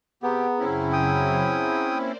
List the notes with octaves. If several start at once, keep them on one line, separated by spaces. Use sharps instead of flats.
C3 B3 G4 G#4 F#5 A#5
F#2 C#3 C4 C#4 E4
G5 D#6
A#3 C5 D5